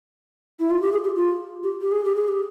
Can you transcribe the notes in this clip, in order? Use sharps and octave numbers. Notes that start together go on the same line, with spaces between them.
E4
F4
G4
G#4
G4
F4
G4
G4
G#4
G4
G#4
G4